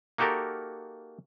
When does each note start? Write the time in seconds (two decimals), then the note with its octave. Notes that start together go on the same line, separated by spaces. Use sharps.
0.18 A#3 D#4 F#4 G4 A4 A#4